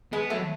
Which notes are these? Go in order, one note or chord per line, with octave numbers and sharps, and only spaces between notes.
G#3 B3
F#3 A3